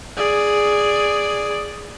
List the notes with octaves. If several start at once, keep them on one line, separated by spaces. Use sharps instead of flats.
G#4 D5